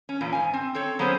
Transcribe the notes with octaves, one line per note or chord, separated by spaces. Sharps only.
C#4
E2 A#2
G#2 G#5
C4
C4 A4 C#5
F#3 B3 C#4 G#4 C5